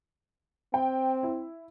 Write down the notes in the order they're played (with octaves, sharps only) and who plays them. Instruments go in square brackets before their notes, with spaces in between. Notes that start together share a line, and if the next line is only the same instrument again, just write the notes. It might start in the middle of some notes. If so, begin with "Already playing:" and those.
[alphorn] C4 [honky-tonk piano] G5
[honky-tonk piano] E4